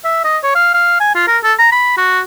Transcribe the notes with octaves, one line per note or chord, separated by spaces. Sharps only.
E5
D#5
C#5
F5
F5
G#5
F4
A#4
A4
A#5
B5
F#4